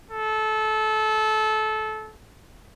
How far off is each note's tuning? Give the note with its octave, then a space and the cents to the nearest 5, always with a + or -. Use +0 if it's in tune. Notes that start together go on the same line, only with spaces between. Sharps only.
A4 -20